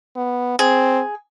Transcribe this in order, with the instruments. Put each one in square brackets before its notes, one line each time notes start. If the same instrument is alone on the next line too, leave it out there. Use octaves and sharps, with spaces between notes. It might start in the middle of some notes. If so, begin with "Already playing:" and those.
[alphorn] B3
[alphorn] C4 [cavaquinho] G#4